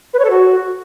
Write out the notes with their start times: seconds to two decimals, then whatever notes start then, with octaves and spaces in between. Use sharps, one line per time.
0.14 B4
0.19 C#5
0.25 A4
0.30 F#4